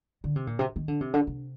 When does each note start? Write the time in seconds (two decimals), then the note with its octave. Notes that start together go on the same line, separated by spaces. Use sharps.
0.24 D3
0.36 C3
0.47 A#2
0.59 C3
0.76 D#3
0.88 D3
1.01 C3
1.14 D3
1.27 C3